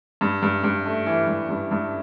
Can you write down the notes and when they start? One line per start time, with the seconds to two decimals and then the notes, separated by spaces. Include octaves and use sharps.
0.21 G2
0.42 G2
0.64 G2
0.86 A3
1.06 E3
1.27 G2
1.49 G2
1.71 G2